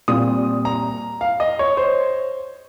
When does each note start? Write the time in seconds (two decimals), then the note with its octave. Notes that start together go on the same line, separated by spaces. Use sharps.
0.08 A#2 G3 C4 F4 D#6
0.65 A#5
1.21 F5
1.40 D#5
1.59 C#5
1.77 C5